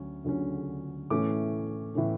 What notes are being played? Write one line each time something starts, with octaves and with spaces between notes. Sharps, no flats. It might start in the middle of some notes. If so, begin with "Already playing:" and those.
Already playing: D2 F#3 C#4
D2 D3 F#3 C#4
A2 E3 A3 C#4 D6
A2 E3 A3 C#4